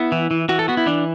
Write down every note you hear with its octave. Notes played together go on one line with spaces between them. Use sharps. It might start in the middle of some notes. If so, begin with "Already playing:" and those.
Already playing: B3 E4
E3
E3
E3 F#4
A4
B3 F#4
E4
E3 D4